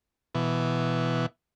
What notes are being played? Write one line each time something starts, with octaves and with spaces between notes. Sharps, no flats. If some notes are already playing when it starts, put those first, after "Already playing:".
B2 E3